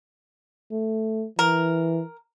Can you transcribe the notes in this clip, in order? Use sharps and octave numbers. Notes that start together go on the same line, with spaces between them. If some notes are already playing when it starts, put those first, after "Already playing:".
A3
E3 A#4